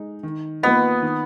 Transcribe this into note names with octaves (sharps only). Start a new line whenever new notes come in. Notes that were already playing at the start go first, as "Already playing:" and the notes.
Already playing: G#3 D#4
D#3
A#3 B3 F4 B4 D#5
D#3